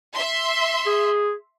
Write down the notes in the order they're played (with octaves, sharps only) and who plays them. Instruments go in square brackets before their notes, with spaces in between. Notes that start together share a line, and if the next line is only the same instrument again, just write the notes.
[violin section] E5 C6
[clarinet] G#4